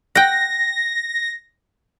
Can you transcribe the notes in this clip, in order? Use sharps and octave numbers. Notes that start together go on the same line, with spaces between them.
F#5 G5 A#6